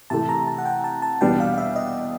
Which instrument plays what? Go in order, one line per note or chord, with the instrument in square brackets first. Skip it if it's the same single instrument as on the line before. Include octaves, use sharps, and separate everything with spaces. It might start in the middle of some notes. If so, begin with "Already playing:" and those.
[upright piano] C3 E3 A3 [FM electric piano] A5
[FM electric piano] A#5
A5
F#5
G5
A5
A5
[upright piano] E2 B2 G3 B3 D4 [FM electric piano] G5
[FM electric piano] F5
F5
E5
D#5